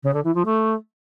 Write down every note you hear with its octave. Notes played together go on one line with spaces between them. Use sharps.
C#3
D3
E3
F3
A3